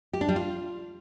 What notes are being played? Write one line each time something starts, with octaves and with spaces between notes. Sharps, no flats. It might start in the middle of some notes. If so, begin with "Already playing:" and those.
G4
D4
G3
F4